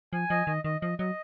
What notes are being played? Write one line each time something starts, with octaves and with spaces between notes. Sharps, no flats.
F3 G#5
F3 D#5
D#3 D#5
D#3 D#5
F3 D#5
F#3 D#5